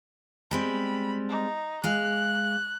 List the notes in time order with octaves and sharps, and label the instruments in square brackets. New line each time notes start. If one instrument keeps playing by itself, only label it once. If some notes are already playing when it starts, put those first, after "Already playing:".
[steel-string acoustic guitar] G3 G#3 C4 [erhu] B5
[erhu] D#4
[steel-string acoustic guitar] G#3 F5 [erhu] F#6